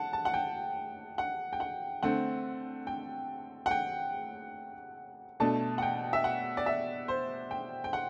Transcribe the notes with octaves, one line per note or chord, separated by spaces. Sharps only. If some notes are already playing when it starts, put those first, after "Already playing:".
Already playing: F#5 A5
A5
F#5
G5
F#5
G5
F#5
D3 A3 C4 F#5
G5
F#5
G5
B2 A3 D4 A5
F#5
G5
E5
F#5
D5
E5
C5
G5
G5
F#5